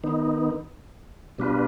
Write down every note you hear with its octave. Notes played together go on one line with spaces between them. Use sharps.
D#3 B3 D#4
B2 G3 D4 F4 B4